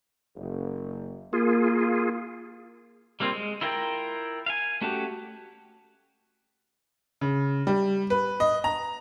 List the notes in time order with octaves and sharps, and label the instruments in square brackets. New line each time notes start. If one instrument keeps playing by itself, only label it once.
[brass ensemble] F#1
[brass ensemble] A#3 [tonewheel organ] F4 G#4
[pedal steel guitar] G3 A#3 C4 F4
G#3
E4 F4 A#4 G5 A#5
F5 G#5
A3 C#4 F#4 G4
[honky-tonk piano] C#3
G3
B4
D#5
A#5